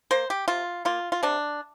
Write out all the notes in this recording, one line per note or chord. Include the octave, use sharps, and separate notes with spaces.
A#3 C5
G4
C3 F4
A#3 F4
F4
C3 D4